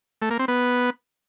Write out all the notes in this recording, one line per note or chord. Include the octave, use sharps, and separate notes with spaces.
A3
A#3
C4
B3